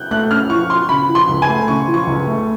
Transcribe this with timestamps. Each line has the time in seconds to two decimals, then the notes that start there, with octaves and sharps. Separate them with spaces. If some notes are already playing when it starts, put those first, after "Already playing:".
Already playing: F#6 G6
0.11 A3 F#6
0.30 C#4 F6
0.50 F3 C#6
0.69 F4 C6
0.89 C#3 B5
1.09 F3
1.15 C6
1.29 C#2
1.42 G#5
1.49 A3
1.68 C#3 C#6
1.88 F3
1.94 C#6
2.07 C#2
2.27 A3